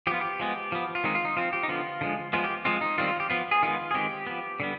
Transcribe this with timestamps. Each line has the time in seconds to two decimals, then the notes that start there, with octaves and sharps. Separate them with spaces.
0.07 F3 G4
0.11 B3 F4
0.21 G4
0.40 F3 G#3 B3
0.72 F3 B3
0.95 F4
1.04 D#3 G#3 C4 D#4
1.15 F4
1.25 D#4
1.37 F3 C4 F4
1.53 G4
1.63 D#4
1.68 D3 F3 B3 F4
2.01 D3 F3 G#3
2.33 F3 G#3 B3 F4
2.44 G4
2.65 F3 G#3 C4 F4
2.81 D#4
2.98 D#3 G3 C4 F4
3.08 F4
3.20 G4
3.30 F3 B3 F4
3.51 G#4
3.63 D#3 G#3 B3 F4
3.91 G#4
3.94 D#3 G#3 C4 G4
4.27 F3 B3
4.60 D3 G3 B3